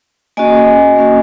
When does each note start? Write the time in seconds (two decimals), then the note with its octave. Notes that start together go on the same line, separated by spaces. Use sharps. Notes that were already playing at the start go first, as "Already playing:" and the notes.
0.37 A#3 C#4 F#4 D#5 G#5
0.96 A#3 C#4 F#4